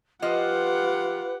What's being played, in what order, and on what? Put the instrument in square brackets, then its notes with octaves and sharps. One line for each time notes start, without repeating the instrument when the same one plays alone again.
[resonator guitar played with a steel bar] F3 D#5 [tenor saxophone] F4 [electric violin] G4 F#5 [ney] B4